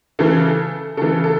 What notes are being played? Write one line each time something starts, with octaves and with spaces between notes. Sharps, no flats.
C#3 E3 A4
C#3 E3 A4
A4